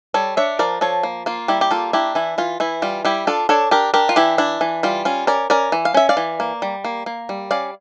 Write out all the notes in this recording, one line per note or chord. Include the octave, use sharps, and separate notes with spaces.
G3 A4 C#5
D4 C#5 E5
F3 A#4 D5
F3 A4 C#5
A#3
A#3 F4
G3 E4 G4
G4
A#3 F4 A4
D4 E4 G4
E3 E4
E3 F4
E3 E4
G3 F4
G3 E4 G4
D4 F4 A4
D4 A4 C#5
D4 G4 A#4
D4 G4 A#4
F4
E3 E4 G4
D4 E4
E3
G3 F4
C#4 F4
C#4 A#4 D5
C#4 A#4 D5
E3
F5
C#4 E5
D5 F5
E3
A#3
G3
A#3
A#3
G3
C#4 D5 F5